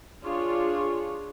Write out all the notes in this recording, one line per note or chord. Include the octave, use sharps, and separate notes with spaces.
D4 F4 G#4 C#5